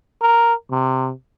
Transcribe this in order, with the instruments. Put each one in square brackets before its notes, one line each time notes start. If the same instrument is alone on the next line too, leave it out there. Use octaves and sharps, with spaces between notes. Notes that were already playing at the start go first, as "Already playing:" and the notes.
[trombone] A#4
C3